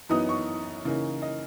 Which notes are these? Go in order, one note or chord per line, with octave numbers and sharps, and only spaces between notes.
F#2 E3 B3 D#4 D#6
C#6
C#3 E3 A#3 D#4
D#5